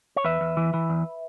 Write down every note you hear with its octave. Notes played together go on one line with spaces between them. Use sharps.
C#5
E2 B4 E5
E2
E3
E3
E2